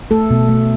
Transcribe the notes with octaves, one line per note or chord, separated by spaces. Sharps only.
A3 A4
B2
A3